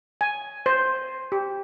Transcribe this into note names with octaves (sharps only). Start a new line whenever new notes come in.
G#5
C5
G4